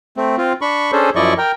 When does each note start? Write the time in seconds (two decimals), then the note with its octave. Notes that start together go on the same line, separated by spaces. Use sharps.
0.17 A3 C4
0.38 C4 F4
0.61 D4 B5 C#6
0.92 C#4 D4 G#4 A4 C5
1.16 F#2 F3 E4 D5 D#5 C#6
1.38 A#4 G5